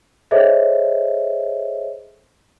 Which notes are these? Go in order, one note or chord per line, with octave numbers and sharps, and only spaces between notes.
G#4 A4 C5 C#5 D#5 E5